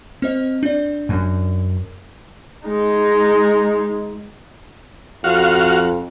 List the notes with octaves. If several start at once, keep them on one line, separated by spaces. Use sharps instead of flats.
C4 C5 D#5
D4 D5
F#2
G#3 D#4
F2 F#4 F5